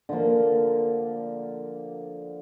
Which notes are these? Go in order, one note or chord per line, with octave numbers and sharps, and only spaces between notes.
D3 F3 A#3